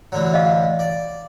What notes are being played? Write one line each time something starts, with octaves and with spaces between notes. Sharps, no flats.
A1 D3 F#3
D#5 F5
D5